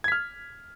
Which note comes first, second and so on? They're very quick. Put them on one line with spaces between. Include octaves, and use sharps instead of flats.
G#6 B6 F6